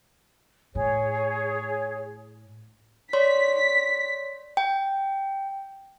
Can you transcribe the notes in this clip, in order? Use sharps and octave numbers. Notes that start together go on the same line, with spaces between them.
A2 G#4 C#5
C#5 D5 C6 B6
G5